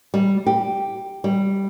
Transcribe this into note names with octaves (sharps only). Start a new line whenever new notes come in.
G3
G4
G3